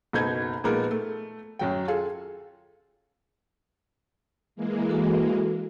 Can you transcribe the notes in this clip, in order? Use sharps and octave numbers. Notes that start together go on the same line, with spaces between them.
F#1 B2 D#4 A4 G6 G#6
A#2 F3 G#3 B3 D#4 A#4
A3
F#2 F#3 G5
F4 G#4 A4
E3 G#3 A#3
F#4 A4